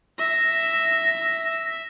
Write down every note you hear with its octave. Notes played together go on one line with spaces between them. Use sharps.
E5 A#6